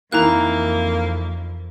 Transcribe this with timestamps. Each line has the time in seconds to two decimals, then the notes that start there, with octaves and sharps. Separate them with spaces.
0.12 F2 D#3 E3 A#3 E4 A#5 F#6